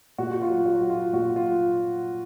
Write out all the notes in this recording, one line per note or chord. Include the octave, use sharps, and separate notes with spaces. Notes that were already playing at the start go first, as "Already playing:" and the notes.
A#2 F#4
F#4
F4
F#3
F#4
F#3
F4
A#2 F#4
F4
F#3